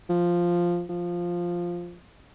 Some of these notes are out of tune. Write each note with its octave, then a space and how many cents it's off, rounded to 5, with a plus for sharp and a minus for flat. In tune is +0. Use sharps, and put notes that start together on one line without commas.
F3 +0
F3 +0